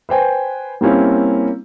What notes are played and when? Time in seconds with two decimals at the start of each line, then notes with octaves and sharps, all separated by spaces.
0.09 B4 C5 G5 G#5
0.81 G3 A#3 C4 C#4 E4